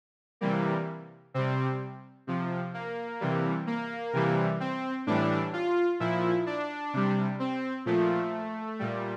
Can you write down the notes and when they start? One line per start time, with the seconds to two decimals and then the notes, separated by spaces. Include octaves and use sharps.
0.41 C3 E3 G3 A#3
1.34 C3 G3 C4
2.27 C3 F3
2.74 A#3
3.21 C3 E3 G3
3.67 A#3
4.13 C3 E3 G3
4.60 C4
5.07 A2 E3 G3 D4
5.53 F4
6.00 A#2 F3 E4
6.46 D4
6.93 C3 G3
7.39 C4
7.85 A#2 F3 A3
8.79 A#2 G3